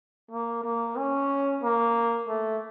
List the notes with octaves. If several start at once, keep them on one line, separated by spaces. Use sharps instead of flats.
A#3
A#3
C#4
A#3
A3